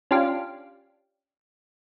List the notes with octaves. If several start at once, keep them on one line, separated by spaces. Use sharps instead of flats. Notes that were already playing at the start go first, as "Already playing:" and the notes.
C#4 D4 F4 G4 F5